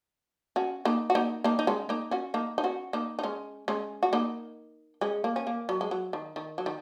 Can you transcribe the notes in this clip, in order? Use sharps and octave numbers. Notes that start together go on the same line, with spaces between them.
C#4 F#4
A#3 D#4
F#4
A#3 D#4
A#3 D#4
D#4
G#3 C#4
A#3 D#4
C#4 F#4
A#3 D#4
D#4
C#4 F#4
A#3 D#4
D#4
G#3 C#4
G#3 C#4
F#4
A#3 D#4
G#3 C#4
A#3
C#4
A#3
F#3
G#3
F#3
D#3
D#3
F#3
D#3